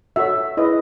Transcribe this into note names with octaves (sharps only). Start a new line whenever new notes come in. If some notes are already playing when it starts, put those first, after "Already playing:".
F#4 A4 C#5 E5
E4 G#4 B4 D#5